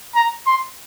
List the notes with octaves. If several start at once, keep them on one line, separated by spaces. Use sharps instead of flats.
A#5
C6